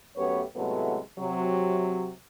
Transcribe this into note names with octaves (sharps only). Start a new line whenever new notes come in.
F#2 A3 B3 G4 B4 C#5
A2 C3 F#3 G#3 A3 B3
C3 F#3